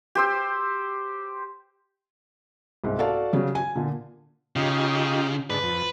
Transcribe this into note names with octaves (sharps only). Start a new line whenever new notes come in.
G4 C5 E6
C2 G#2
F#4 A4 D5 F5 A5
C#3 F#3 G3
G#5
A#2 D3
C#3 D#4 F4 G4
G#2 D3 B4
F2